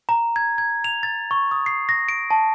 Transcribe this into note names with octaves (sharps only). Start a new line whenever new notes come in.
A#5
G#6
G#6
F7
A6
C#6
D#6
C7
A#6
D7
A5